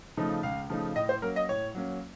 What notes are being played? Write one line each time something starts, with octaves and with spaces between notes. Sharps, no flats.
C#3 F3 A3 D#4
C#2 F5
C#3 F3 A3 D#4
A2 D#5
C5
F#3 A#3 C#4 A#4
D#5
A2 C#5
F#3 A#3 C#4